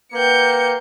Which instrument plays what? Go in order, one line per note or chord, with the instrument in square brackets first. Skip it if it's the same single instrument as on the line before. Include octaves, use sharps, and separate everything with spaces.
[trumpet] A#3 [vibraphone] B4 F#5 G5 [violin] G6 C#7